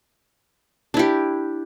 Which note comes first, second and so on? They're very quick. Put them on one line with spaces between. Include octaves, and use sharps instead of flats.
D4 E4 G4